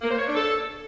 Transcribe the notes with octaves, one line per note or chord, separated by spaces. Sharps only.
A#3
C5
C#5
D4
A4